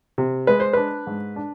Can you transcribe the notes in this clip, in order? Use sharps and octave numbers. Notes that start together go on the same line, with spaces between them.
C3
G#3 B4
C5
D4 B4
G#2
D4